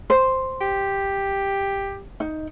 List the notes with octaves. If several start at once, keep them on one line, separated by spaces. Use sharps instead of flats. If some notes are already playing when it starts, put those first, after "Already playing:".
C5
G4
D#4